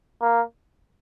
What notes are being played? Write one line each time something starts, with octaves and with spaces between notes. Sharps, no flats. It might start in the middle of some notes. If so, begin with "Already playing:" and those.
A#3